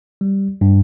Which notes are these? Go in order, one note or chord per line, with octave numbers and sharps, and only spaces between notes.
G3
G2